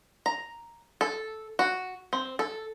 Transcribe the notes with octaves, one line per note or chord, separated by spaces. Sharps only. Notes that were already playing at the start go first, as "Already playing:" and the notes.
A#5
A4
F#4
C4
A4